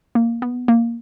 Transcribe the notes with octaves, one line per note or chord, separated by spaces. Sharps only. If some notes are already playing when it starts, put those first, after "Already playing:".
A#3
B3
A#3